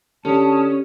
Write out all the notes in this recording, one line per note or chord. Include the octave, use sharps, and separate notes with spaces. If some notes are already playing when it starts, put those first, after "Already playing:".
D3 C#4 G4 A5 D#6